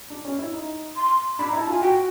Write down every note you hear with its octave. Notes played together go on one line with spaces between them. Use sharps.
D4
C#4
E4
D#4
C6
D4 B5
A#5
E4
A5
F4
G#5
F#4 G5